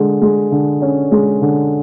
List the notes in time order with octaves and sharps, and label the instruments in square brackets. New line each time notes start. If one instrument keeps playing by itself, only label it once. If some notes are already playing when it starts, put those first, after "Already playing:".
Already playing: [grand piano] D3 G#3
G#3
D3
C#4
G#3
D3